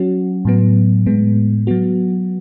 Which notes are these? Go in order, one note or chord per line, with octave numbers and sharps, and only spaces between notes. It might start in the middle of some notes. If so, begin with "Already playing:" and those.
Already playing: F#3 C#4 F#4
A2 F#3 B3
A2 G#3 B3
F#3 B3 F#4